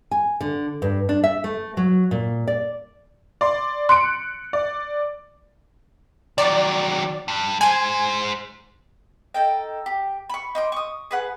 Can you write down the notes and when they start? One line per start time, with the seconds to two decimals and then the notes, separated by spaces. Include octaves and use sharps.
0.11 G#5
0.41 D3
0.82 G2
1.09 D4
1.24 E5
1.44 A3
1.77 F#3
2.11 A#2
2.47 D5
3.41 D5 C6
3.89 C6 F#6 C#7 D7
4.53 D5
6.38 D#3 F#3 D5
7.28 G2
7.61 G#3 C5 G#5
9.34 D#4 A4 G5
9.86 G4
10.29 B5 C#6
10.55 D#4 C6 D6
10.72 C#6 D#6
11.11 G#4 B4 F#5